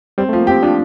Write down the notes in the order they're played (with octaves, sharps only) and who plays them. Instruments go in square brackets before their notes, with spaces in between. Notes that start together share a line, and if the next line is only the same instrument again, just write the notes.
[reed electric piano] G3 [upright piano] C4
[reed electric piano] A3
[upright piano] F3
[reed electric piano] A#3
[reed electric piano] C4 [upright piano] G4
[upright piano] F3 [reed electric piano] D4